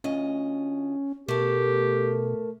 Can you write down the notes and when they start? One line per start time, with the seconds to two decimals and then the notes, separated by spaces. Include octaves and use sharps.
0.04 D2 C#4 F4 D#5
1.28 B2 A3 G4 A4 A#4